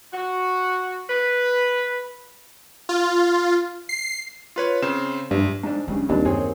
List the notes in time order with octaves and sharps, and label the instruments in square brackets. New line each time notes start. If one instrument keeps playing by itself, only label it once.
[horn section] F#4
B4
[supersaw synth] F4
C7
[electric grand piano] F4 B4 C#5
C#3 C4 E7
[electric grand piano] A#1 [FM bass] G2
[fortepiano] G#2 D4
[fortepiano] G2 C#3 [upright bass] G#3
[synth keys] D#2 [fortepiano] A#2 D4 [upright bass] G3 C4
[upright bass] F#2 [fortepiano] C4 G#4 C#5